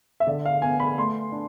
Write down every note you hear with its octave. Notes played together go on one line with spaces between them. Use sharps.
E5
D3 D5
F5
B3 G#5
B5
A3 C6
D4